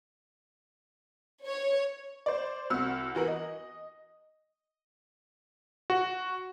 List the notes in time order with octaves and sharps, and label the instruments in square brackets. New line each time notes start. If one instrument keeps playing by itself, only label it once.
[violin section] C#5
[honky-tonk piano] C5 D5
C2 F#4 E6 F6
E3 F#4 A#4 F#7
D#5
[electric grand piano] F#4